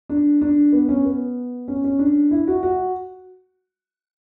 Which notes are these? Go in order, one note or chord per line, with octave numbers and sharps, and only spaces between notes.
D4
D4
B3
C#4
B3
C#4
C#4
D4
E4
F#4
F#4